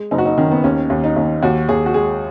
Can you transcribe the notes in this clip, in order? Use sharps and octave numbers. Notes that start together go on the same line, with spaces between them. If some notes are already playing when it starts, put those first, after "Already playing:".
Already playing: G#3
F#1 D#4
F#4
D#4
D#3 C#4
B3
D#2 C#4
D#2
D#4
D#2
D#2 F#4
D#2 G#4
F#4
G#3 G#4